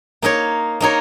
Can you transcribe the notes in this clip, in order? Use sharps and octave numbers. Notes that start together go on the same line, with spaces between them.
A#3 D#4 A#4 C#5
A#3 D#4 A#4 C#5